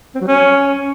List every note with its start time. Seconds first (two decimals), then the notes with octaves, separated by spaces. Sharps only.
0.15 C4
0.21 F#3
0.27 C#4